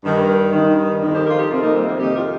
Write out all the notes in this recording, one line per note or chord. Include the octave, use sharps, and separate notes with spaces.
G2 D#3
G2 D#3
F2 D#3
G4 C5
F4 A#4
D#4 G4
F2 C3 D#3 C4 F4
A#3 D#4
G3 C4
A#3 D#4
F2 D#3 D#4 G4
F4 A#4